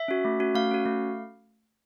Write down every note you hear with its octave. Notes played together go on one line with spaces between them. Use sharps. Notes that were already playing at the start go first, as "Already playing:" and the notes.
Already playing: E5
C#4 F#4
A3
C#4 F#4
A3 F5
C#4 F#4
A3